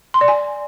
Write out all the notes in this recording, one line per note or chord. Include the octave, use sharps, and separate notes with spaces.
C6
D5
G#5